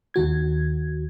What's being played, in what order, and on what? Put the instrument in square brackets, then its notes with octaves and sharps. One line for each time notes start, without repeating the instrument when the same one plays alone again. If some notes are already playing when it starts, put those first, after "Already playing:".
[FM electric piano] D#2 D#3 F#4 G#6